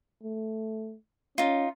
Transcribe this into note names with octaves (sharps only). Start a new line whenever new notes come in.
A3
C#4 D#4 F4